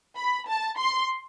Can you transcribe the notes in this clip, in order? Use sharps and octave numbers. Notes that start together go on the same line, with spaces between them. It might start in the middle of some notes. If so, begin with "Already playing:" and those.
B5
A5
C6